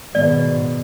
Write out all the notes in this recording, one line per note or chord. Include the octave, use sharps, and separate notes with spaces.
G#2 B2 D#3 G#3 B3 D5